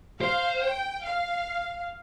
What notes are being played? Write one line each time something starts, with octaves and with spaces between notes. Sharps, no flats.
C5 F5
G5
F5